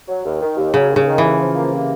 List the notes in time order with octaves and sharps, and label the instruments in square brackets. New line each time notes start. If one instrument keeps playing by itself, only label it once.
[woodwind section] F#3
D#2
D#3
D#2
[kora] C#3 [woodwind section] F#3
[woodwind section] D#2
[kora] C#3
[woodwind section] D#3
[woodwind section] D#2 [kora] E3
[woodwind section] F3
A#3
C3